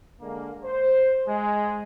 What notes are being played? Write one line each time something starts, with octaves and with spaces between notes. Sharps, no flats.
D3 G#3 A#3
C5
G#3